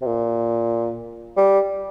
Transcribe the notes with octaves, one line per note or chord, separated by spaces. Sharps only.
C3
A#2
G3